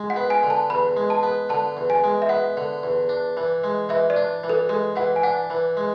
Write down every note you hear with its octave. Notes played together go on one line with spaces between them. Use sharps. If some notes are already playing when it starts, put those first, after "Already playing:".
Already playing: G#3
F#5
B3
G#5
D3
A5
E2 B5
G#3
A5
B3
D3 A5
E2
G#5
G#3
E5
B3 F#5
D3
E2
D4
E3
G#3
E3 E5
D5
D4
E3
A4
G#3 A4
E3 F#5
G#5
D4 F#5
E3
G#3